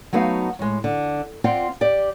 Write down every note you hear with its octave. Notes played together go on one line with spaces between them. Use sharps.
F#3 A3 B3 D#4 F5
A2 G#3
D3
C4 F4 D5 F#5 G5
G4 D5